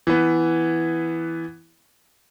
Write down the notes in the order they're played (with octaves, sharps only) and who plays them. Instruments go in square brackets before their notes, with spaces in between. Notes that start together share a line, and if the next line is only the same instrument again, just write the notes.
[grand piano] E3 B3